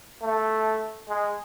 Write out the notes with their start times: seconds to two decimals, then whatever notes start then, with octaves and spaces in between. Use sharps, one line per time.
0.23 A3
1.09 G#3